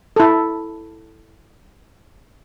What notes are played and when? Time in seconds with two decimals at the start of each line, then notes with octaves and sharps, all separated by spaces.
0.16 E4 A4